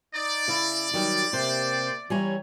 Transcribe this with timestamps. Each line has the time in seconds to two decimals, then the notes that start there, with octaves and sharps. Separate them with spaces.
0.15 D#4 D5
0.48 C#3 E4
0.94 D#3 F#3 G3
1.33 C3 A#3 G4 C5
2.10 E3 G3 C#5 G#5 A#5